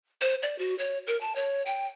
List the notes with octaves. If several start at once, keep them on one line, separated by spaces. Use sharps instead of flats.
C5
D5
F#4
C#5
A#4
A5
C#5
G5